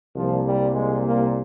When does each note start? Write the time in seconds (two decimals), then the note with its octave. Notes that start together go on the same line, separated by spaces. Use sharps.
0.15 C2 A#2 F3
0.45 G3
0.73 G#3
1.03 A#3